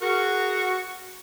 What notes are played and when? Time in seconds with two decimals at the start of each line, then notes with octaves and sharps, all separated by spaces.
0.01 F#4 G#4 A#4 F#5